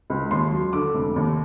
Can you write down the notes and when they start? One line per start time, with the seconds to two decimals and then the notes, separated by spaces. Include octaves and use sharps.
0.10 C#2
0.31 D#2 C6
0.52 F#3
0.73 D3 D6
0.94 F1
1.16 D#2